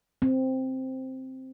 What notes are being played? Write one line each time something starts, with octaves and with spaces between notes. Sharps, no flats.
C4